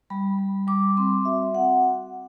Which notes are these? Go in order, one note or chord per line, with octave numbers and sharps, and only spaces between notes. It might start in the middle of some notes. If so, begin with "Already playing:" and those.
G3 B5
G3
G3 D6
C4 C6
F#4 E5
C4 F#5